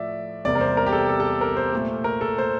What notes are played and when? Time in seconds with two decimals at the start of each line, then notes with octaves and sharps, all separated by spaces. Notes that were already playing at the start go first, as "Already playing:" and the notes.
Already playing: A2 F3 A3 D5 E5
0.45 E2 C3 G3 A#3 D5
0.55 A#4
0.61 C5
0.77 A#4
0.86 G4
0.92 A4
1.09 A4
1.20 A4
1.41 A#4
1.57 C5
1.73 A#2 A3
2.04 A#4
2.21 A4
2.38 C5